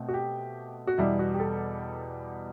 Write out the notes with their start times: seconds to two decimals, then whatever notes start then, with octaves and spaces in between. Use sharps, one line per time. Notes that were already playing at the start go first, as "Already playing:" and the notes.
Already playing: B2 A3 C4
0.08 F#4
0.14 G4
0.87 F#4
0.98 E2 B2 G3 E4
1.19 F#4
1.34 G4
1.40 A4